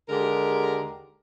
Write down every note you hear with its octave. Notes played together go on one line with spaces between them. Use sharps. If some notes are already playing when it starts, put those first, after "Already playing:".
D#2 D3 G#3 G4 A#4